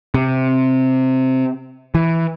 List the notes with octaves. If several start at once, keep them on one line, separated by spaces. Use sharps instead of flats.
C3
E3